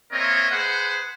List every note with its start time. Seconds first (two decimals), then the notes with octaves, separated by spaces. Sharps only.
0.13 A#3 C4 A#4 C#5 D#5 E5
0.51 G#4 B4 C5 F#5